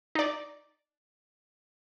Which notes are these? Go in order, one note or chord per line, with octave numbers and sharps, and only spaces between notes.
D#4 D5